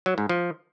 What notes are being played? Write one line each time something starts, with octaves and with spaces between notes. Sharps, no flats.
F#3
G#2
F3